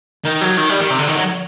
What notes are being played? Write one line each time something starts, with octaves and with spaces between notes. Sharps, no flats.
D#3
F#3
D#3
G3
D#3
C3
D3
D#3
F#3